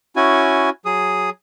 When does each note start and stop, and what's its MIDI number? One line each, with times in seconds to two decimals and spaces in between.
0.16 0.70 61
0.16 0.70 64
0.16 0.70 66
0.16 0.70 80
0.85 1.30 54
0.85 1.30 68
0.85 1.30 87